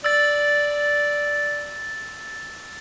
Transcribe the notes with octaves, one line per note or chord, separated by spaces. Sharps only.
D5 E6 A6